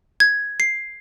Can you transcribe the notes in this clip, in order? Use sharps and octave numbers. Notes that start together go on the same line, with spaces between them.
G#6
C7